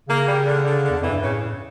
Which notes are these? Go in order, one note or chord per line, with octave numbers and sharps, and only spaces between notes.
C#3 A#3
G3
D3
D3
D3
E2
F2 E3
G2
A2 C#3